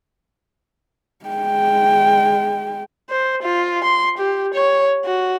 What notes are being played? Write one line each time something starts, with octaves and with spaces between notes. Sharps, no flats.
G#3 G5
C5
F4
C6
G4
C#5
F#4